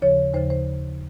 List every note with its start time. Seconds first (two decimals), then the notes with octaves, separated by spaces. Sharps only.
0.01 D#2 C#3 F3 C#5
0.34 D#2 C#3 F3 C5
0.50 C5